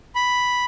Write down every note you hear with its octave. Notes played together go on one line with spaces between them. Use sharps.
B5